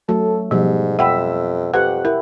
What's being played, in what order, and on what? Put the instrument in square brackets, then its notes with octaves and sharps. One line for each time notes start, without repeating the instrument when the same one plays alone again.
[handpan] F#3 A3 [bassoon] A4
[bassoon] G#2 [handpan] B2 G3 [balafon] F3
[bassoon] F2 [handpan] E5 [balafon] F#5 G5 B5
[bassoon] F2 [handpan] G4 F#5 [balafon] B4
[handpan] E4 [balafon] A#4